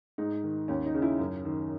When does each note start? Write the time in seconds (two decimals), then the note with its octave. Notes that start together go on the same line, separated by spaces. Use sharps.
0.18 G#2 D#4
0.44 D#3
0.68 D#2 C#4
0.86 D#4
0.95 C#3
1.02 C#4 E4
1.20 F#2
1.45 D#3